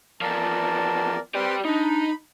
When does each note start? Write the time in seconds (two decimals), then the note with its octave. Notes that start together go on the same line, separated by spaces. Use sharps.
0.22 E2 F3 A#4 D5 A5
1.35 C4 G4 B4 D5 C6
1.65 D4 D#4 B5